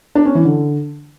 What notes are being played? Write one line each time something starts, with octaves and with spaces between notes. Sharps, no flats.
D4
C#4
E3
D3